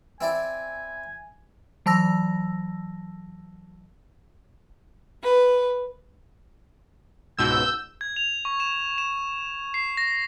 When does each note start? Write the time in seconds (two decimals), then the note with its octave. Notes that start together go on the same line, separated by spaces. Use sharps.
0.21 C4 E4 D5 G#5
1.86 E3 F#3 A5 E6 A#6
5.22 B4
7.38 C#2 G#2 B2 E6 G6
8.01 G#6
8.16 F7
8.45 C#6
8.60 E7
8.98 E7
9.74 C7
9.97 A#6